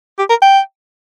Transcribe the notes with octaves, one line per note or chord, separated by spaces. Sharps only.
G4
A#4
G5